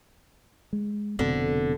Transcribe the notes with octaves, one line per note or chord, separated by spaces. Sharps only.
G#3
F1 B2 D3 C4